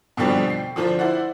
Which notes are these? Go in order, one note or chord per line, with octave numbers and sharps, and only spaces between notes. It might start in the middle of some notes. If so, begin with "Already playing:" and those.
B2 D3 F3 G3 C4 D4
G5 C7
D3 F3 D4 F4 C5
E4 C5 D5 F#5